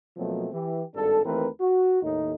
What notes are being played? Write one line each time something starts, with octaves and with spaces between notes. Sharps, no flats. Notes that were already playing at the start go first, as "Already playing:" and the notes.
B2 F3 F#3 A3 A#3 C4
E3 G4
G#1 G2 D4 A4
D#2 E3 A3 C4 A#4 B4
F#4
D#2 A2 D#4